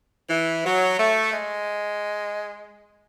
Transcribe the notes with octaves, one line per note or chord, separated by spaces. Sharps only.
E3
F#3
A3
G#3